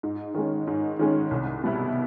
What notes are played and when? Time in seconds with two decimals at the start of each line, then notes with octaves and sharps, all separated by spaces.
0.03 G#2
0.35 D#3 G#3 C#4
0.67 G#2
0.99 D#3 G#3 C#4
1.31 C2
1.64 B2 G3 B3 E4